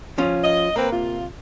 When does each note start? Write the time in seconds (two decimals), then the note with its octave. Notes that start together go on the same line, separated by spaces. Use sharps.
0.18 F3 C#4 F4
0.43 D#5
0.76 A#3 C4 A#4 B4
0.92 C3 F4